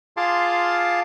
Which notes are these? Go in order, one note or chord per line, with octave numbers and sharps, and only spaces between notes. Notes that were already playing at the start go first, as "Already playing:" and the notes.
F4 G#4 F5 A5 C6 D6